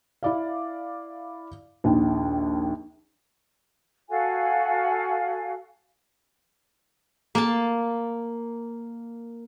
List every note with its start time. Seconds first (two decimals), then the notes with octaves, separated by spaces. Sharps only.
0.23 E4 D5 F5
1.84 A#1 D#2
4.09 F#4 A4 F5 G#5
7.35 A#3 A5